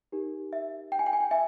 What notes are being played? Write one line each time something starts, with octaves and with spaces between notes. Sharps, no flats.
D#4 G4 A#4
E5
G5
G#5
G5
G#5
G5
E5 G#5